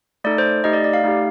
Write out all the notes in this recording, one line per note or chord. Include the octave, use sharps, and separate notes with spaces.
A3 D#4 A4 D5
C5
A3 D#4 G4 D#5
D5
D5
F5
A3 D#4 G4